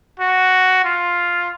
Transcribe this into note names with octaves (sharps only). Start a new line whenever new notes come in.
F#4
F4